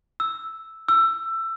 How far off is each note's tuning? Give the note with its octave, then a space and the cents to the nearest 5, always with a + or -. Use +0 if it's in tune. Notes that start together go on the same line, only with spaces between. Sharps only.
E6 -5
E6 +20